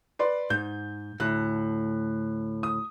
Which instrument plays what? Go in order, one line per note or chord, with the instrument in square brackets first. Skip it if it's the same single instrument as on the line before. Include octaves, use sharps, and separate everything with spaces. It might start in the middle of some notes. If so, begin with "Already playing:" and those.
[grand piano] B4 D5 C6
[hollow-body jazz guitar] G#2 [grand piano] G6
[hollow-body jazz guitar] D2 A2 [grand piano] F#6
[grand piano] D#6